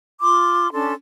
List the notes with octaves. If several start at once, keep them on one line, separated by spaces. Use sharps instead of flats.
F4 C6 D6
C#4 D4 A4 C6